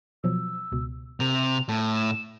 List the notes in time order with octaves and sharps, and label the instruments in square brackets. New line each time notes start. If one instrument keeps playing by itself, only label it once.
[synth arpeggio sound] B2 F3 F#3 [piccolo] E6
[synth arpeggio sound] C#2 B2
[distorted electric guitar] C3 [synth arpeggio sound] A#4 [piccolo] F7
[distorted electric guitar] A2 [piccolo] A5
[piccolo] E7